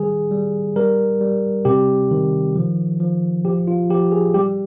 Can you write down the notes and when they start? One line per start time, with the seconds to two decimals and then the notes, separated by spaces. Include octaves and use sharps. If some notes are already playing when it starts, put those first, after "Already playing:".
Already playing: D#3 G3 G#4
0.31 G3
0.76 G3 A#4
1.21 G3
1.65 C3 G4
2.11 D#3
2.55 F3
3.00 F3
3.45 F3 G4
3.67 F4
3.90 F3 G4
4.12 G#4
4.34 G3 G4